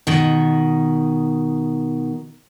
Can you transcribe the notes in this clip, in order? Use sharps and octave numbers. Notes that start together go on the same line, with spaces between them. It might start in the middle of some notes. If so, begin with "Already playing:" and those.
B2 D#3